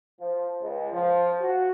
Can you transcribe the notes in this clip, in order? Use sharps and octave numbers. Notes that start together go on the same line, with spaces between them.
F3
C#2
F3
F#4